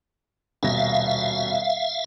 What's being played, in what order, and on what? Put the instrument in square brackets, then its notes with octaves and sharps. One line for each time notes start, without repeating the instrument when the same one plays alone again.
[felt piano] D#1 B2 A#6 [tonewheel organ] E5 F5